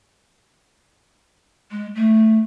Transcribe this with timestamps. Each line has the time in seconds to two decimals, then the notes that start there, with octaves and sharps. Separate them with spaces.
1.71 G#3
1.95 A3